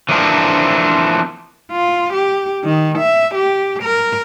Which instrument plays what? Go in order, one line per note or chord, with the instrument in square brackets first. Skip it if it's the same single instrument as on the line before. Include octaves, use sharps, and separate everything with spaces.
[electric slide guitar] E3 F3 A#3 C4 D4
[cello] F4
G4
D#3
E5
G4
A#4